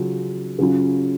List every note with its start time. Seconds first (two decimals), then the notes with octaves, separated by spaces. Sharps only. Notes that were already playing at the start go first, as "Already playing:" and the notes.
Already playing: C#3 F#3 C#4 F4
0.59 C#3 F#3 C#4 F4